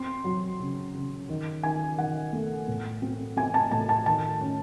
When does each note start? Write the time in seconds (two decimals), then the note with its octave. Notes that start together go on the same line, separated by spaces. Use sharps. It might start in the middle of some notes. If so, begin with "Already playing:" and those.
Already playing: C4 C6
0.24 F#3
0.60 C#3
0.94 C#3
1.29 D#3
1.63 D#3 G#5
1.98 D#3 F#5
2.33 A3
2.68 A2
3.02 C4
3.37 C4 G#5
3.54 A5
3.71 A2 A5
3.89 A5
4.06 D#3 A5
4.41 C#4